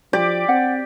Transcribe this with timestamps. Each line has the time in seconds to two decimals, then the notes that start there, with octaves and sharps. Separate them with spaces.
0.13 F3 G4 D5 D6
0.49 C4 F#5